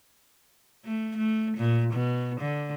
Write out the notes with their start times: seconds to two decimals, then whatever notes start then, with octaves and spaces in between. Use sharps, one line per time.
0.85 A3
1.17 A3
1.58 A#2
1.93 B2
2.40 D3